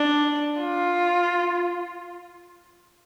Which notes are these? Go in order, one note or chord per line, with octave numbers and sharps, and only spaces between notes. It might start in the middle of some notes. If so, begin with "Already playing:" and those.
Already playing: D4
F4